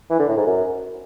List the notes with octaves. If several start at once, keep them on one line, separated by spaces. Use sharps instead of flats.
E3
D3
A2
G#2
F#2